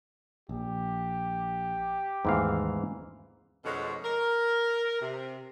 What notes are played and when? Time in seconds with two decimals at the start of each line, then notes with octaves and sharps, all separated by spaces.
0.49 A#1 G4
2.25 D#2 G#2 E3 A3 B3 F5
3.65 F2 B2 D3 G#3 A3 C#5
4.04 A#4
5.01 C3